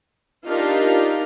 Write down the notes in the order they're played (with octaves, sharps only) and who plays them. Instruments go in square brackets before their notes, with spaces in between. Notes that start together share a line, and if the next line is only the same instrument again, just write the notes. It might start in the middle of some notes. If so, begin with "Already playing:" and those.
[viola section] D4 D#4 F4 G4 A#4 F5